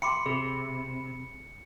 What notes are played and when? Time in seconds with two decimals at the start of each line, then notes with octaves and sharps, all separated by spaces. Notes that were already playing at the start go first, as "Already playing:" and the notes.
0.02 G5 B5 C6 D6 C#7
0.26 C3 G#4